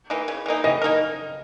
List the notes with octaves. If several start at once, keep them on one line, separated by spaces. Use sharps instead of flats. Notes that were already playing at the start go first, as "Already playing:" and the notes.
E3 A#3 D#4
C#3
E3 A#3 D#4
E3 D#5
A#3 D#4 A#4